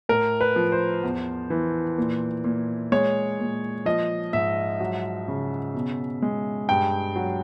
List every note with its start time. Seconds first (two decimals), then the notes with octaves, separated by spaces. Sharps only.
0.09 A2 A#4
0.41 B4
0.56 F3
0.72 C5
1.03 E2
1.50 E3
1.98 A#2
2.44 A#2
2.92 G#3 C#5
3.40 A#2
3.86 F3 D#5
4.33 G#2 E5
4.80 F#3
5.28 C#3
5.74 B2
6.22 G#3
6.69 G2 G5
7.16 F#3